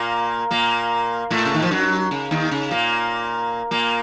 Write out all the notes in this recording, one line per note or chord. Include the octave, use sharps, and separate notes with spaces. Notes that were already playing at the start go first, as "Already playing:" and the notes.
Already playing: A#2 A#3
A#2 A#3
A2 A3
C#3
D#3
F3
F#2 F#3
C#3
D#2 D#3
C#3
A#2 A#3
A#2 A#3